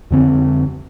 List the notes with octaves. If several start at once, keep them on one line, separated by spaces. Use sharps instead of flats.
F2 D3 C4